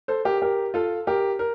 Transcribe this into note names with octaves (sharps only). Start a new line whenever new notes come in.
A4 C5
G4 A#4
G4 A#4
F4 A4
G4 A#4
A#4